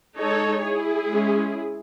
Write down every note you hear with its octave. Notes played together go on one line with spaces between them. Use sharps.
G#3 D#4 A4 C#5
E4 G#4
G#3 C#4